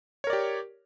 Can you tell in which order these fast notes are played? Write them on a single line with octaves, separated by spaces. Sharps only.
C#5 A#4 D5 G4